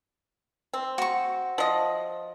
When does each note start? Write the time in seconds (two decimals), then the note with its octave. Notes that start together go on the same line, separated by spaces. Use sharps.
0.73 C4
0.98 F#4 C#6
1.58 F3 D#5